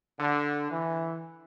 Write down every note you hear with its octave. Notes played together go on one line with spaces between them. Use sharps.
D3
E3